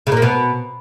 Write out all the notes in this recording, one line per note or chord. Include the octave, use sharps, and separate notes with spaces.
C#3
A#2
A#3
B2